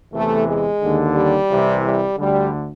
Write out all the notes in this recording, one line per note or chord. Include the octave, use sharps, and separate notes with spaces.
E2 C3 E3 A3
G#3
D#2 D3
G3
C2 C3 E3
G3
D2 D3 G3